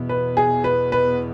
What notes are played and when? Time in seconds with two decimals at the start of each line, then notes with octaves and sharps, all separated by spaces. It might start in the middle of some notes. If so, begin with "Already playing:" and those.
Already playing: E2 B2 B3
0.09 B4
0.37 G#4
0.64 B4
0.92 B4